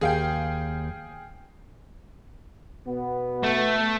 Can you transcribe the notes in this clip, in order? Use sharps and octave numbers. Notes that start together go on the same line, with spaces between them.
D#2 G#4 F5 G5
B2 B3
A3